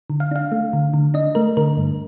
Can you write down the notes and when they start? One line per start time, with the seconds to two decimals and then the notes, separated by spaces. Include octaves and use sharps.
0.10 D3
0.20 F5
0.31 D4 F5
0.52 A3
0.73 D3
0.94 D3
1.14 D4 D#5
1.35 A3 A#4
1.57 D3 A#4
1.77 G2